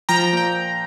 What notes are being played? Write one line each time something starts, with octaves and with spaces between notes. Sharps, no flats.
F3 G5 A#5
A#2 G5